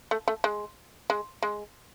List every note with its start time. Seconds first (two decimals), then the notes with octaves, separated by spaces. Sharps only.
0.11 A3
0.28 A3
0.44 G#3
1.10 G#3
1.43 G#3